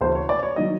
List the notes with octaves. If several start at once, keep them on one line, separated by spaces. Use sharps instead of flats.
D2 C#3 E3 C5
C#5
D5
C#5
D#3 F#3 D#5